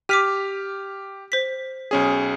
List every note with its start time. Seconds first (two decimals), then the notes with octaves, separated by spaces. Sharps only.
0.09 G4 D6 F6 B6 D#7
1.32 C5 B6
1.91 B1 C#4 G#4